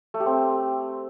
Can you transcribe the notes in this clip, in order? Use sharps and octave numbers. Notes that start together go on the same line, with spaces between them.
A3
G4
C4